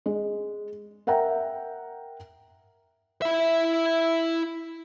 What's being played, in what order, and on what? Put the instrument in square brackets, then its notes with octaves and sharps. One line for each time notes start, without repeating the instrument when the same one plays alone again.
[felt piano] G#3
A#4 E5 F#5 G5 A#5
[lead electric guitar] E4 E5